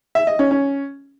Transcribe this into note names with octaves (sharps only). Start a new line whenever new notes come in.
E5
D#5
C#4
C#4